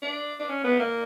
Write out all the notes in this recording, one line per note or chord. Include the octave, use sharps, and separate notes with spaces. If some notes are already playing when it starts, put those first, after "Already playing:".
D4
D4
C#4
B3
A#3